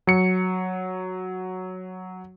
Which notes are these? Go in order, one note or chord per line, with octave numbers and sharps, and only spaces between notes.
F#3 C#7